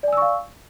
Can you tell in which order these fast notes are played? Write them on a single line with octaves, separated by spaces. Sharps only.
D5 G#5 E6 C#6 F5